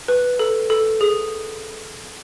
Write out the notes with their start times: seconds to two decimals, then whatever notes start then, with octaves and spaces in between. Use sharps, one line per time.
0.08 B4
0.39 A4
0.70 A4
1.01 G#4